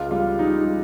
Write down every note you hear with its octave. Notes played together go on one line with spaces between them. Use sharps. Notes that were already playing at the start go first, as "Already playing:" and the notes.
Already playing: C#2 F4
G3 F4
G3 D#4
G3